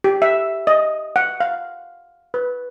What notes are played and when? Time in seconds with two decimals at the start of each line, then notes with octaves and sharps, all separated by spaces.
0.04 G4
0.22 E5
0.67 D#5
1.16 F#5
1.40 F5
2.34 B4